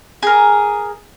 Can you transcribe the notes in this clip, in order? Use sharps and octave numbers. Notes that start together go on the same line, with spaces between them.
G#4 A#4